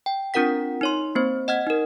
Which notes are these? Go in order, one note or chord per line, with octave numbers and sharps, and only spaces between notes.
G5
C4 D4 F4 A#4 F#5 B6
D#4 C#5 C6
A#3 C4 C5
D#5 F#5 F6 G#6
D#4 A#4